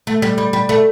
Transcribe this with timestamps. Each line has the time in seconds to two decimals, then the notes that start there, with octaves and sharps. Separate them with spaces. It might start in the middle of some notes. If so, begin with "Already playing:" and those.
0.07 A3
0.22 G3
0.38 G3
0.53 G3
0.69 A3